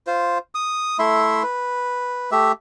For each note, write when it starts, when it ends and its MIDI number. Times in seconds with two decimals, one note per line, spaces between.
0.07 0.38 65
0.07 0.38 72
0.55 0.97 87
0.99 1.43 57
0.99 1.43 64
0.99 1.43 76
0.99 1.43 84
1.43 2.30 71
2.32 2.52 57
2.32 2.52 67
2.32 2.52 76